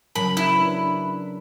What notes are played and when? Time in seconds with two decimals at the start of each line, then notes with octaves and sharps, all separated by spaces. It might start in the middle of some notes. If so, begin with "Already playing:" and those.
0.15 C#3 F#3 A#4 B5
0.37 E4
0.56 D4 B4